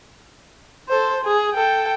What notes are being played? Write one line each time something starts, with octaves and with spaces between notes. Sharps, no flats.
A4 C5
G#4
A4 G5